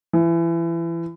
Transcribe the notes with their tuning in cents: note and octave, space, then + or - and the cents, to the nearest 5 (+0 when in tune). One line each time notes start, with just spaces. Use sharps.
E3 +25